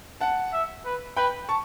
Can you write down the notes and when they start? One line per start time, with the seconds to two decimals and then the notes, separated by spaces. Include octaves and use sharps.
0.21 F#5 A5
0.53 E5
0.85 B4
1.17 B4 G5 B5
1.49 A5 C#6